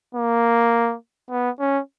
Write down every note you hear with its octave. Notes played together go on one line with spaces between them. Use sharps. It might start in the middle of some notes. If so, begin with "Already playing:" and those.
A#3
B3
C#4